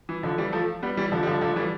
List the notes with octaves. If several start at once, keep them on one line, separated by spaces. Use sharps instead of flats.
E3
D3 F3
E3 G3
F3 A3
G3 B3
E3 G3
D3 F3
G3
D3 F3
D3 F3
A3
E3 G3